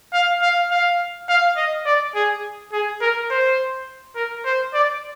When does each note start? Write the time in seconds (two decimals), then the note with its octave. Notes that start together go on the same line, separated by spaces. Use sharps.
0.13 F5
0.42 F5
0.71 F5
1.29 F5
1.57 D#5
1.86 D5
2.15 G#4
2.73 G#4
3.01 A#4
3.30 C5
4.15 A#4
4.45 C5
4.74 D5